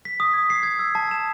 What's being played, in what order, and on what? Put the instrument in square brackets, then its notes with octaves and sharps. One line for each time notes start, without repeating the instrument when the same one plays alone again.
[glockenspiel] B6
D#6
G#6
C7
G#6
E6
A5
E7